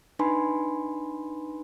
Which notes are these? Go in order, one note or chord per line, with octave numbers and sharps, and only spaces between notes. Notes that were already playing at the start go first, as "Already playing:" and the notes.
D4 D#4 B4 G#5 B5 C6